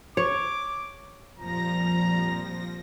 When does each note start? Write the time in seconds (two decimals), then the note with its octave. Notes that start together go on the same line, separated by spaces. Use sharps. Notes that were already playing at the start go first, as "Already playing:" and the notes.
0.17 C#5 D6
1.37 F2 A#2 F3 G3 A#5 A#6